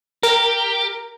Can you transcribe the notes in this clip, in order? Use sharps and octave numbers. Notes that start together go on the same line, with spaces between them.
G4 A#4